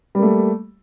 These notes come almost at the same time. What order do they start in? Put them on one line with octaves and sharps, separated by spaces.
G3 A#3 A3